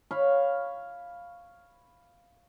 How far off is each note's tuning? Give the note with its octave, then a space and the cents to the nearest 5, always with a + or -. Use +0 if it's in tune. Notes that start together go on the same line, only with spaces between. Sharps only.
C#5 +0 F5 +0 B5 +0